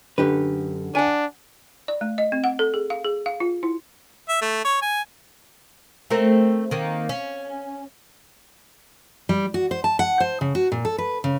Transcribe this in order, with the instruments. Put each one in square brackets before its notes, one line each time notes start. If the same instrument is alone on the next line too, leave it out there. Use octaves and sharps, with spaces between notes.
[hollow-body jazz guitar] F#2 G4 B4 [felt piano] D3
[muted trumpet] D4 [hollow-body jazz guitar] F#5 G#5
[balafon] D5
A3
D#5
C4
F#5
A4
G#4
F5
G#4
F5
F4
E4
[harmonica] E5
A3
C#5
G#5
[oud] A3 C4 A#4
D#3 A#3
C#4
[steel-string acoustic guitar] G3
F#4
C5
A5
F#5
C5
C#3
F#4
A#2
A4
B4
C#3